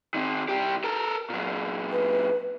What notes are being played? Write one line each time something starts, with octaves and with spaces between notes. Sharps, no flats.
D#3 C4
C2 G4
A4 A#4
A#2 F#3
B4